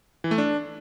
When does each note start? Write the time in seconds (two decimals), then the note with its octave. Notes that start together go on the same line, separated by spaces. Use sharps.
0.24 E3
0.31 A3
0.38 D4